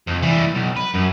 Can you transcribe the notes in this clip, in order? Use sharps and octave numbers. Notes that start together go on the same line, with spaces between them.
F2
E3 G3
B1
B4
F#2